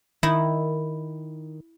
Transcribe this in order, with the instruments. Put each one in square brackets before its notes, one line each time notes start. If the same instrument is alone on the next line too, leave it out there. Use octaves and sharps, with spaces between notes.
[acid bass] D#3 [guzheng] E4